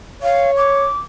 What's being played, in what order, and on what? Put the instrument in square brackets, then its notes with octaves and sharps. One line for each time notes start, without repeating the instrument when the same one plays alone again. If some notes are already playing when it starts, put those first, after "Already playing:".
[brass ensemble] C#5 [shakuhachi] F5
[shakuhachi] D6